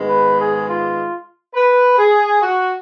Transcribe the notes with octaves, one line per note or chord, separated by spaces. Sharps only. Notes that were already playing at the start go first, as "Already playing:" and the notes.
Already playing: G#2 D#3 G#3 B3
B4
G#4
F4
B4
G#4
F#4